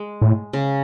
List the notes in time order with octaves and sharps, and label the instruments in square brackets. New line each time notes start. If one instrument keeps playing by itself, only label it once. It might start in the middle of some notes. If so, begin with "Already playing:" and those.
Already playing: [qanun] G#3
[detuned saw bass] A2
[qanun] C#3